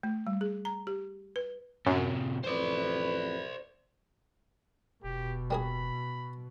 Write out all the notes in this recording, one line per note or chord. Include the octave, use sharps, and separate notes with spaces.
A3
G3
G#4
A#5
G4
B4
F#2 A2 C3
A1 F2 B4 C5 D5
E1 B2 G4
G3 A#3 G#4 B5